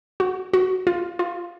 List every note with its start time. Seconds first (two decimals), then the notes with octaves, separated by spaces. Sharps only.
0.20 F#4
0.53 F#4
0.87 F4
1.19 F4